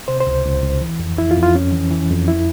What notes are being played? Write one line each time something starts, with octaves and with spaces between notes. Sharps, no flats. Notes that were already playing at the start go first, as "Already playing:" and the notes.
C3 C5
C5
C#2
C#2
C#2
E3
F2
F2 E4
F4
F2
F4
F2 C#4
E3
E3
F2
E4